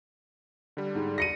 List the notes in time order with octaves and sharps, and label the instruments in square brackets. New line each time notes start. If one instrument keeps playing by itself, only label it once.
[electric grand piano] D3 G3
[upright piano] G#2
A#6 C#7 D#7